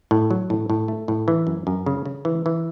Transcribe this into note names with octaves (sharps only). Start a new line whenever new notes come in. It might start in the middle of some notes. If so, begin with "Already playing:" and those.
A2
F#3
A2
A2
A3
A2
E3
F#2
F#2
C#3
C#3
E3
E3